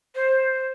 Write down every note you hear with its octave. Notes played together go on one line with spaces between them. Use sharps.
C5